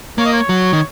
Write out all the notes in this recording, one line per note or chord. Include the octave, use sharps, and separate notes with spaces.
A#3 C#5
D#5
C#5
F#3
D#3